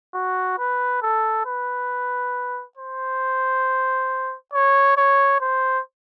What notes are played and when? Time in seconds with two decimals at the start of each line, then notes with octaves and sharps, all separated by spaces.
0.14 F#4
0.59 B4
1.02 A4
1.46 B4
2.77 C5
4.53 C#5
4.97 C#5
5.40 C5